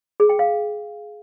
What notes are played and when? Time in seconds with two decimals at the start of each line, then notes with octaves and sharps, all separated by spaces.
0.20 G#4
0.29 G5
0.39 F5